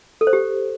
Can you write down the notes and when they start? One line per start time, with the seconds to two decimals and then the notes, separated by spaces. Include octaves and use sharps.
0.21 A4
0.27 C5
0.33 G4